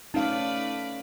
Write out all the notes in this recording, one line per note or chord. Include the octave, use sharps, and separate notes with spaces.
A3 C#4 D#4 B4 D5 F5